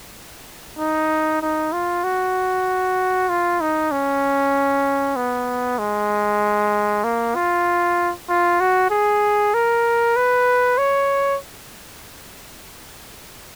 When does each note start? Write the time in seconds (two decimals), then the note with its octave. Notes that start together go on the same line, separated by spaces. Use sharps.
0.79 D#4
1.42 D#4
1.73 F4
2.04 F#4
3.29 F4
3.61 D#4
3.92 C#4
5.16 B3
5.79 G#3
7.04 A#3
7.35 F4
8.29 F4
8.60 F#4
8.90 G#4
9.54 A#4
10.16 B4
10.78 C#5